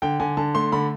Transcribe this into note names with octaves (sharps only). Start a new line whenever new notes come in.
D3 G5
D3 G#5
D3 A5
A3 C6
D3 B5